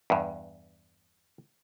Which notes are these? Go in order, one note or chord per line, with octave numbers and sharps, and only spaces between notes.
E2 G2